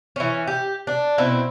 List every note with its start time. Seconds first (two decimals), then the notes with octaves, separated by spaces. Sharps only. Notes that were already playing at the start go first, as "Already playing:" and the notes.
0.16 E3 C#4
0.47 G4
0.87 D4
1.18 B2 C4 E4